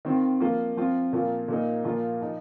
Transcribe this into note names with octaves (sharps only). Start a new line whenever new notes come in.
D#3 C4 F4
F3 A#3 F4
F3 C4 F4
A#2 F3 A#3 F4
A#2 A#3 D#4
A#2 F3 A#3 F4
F3 D#4